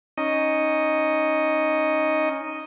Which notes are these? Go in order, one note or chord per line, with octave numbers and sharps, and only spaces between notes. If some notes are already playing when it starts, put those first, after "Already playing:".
C#4 D#4 D#5